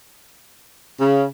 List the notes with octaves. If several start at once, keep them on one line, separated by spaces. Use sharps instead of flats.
C#3